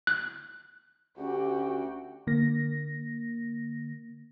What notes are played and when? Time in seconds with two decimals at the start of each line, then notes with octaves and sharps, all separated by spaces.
0.07 F#6
1.18 D2 C#4 F#4 G4 G5
2.27 D3 A#3 A#6